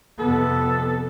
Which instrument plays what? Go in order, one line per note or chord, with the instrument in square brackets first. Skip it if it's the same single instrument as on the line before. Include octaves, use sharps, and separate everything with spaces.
[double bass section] F2 C3 B3 [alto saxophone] A4